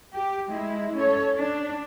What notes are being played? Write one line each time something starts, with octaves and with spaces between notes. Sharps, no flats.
G4
G#3 E4
C#4 A4 C#5
D4